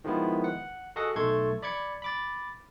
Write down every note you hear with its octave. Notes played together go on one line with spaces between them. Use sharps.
D#3 F3 G#3 B3 E4
F#5
F#4 G#4 A4 D#5 F#5
B1 A3 A4 C6 C#6 G#6
D5 B5 D6 G#6 C#7
B5 D6 A6